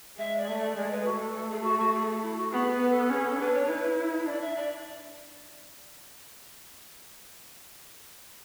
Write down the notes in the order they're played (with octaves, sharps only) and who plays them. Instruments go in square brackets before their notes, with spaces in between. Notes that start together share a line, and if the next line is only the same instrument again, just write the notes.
[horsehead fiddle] G#3 [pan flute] E5
[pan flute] D5
[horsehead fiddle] A3 [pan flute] E5
[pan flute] D5
[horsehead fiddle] G#3 [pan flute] D5
[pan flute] B4
[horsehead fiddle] A3 [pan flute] F#4
[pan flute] A4
A4
G#4
F#4
F#4
G#4
E4
F#4
[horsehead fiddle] B3 [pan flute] G#4
[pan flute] B4
A4
[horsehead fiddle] C#4 [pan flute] G#4
[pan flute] A4
[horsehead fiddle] D4 [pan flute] B4
[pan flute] C#5
[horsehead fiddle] E4 [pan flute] B4
[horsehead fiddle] D4 [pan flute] D5
[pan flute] E5
D5